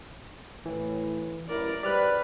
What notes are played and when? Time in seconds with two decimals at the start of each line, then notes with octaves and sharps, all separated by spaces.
0.66 A2 E3
1.48 A1 F#2 E4 A#4 D5
1.83 G#2 G3 B4 D5 F6 F#6